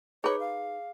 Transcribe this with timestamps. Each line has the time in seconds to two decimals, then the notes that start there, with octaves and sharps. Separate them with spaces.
0.24 D#4 G#4 B4 C#5 D6
0.39 F5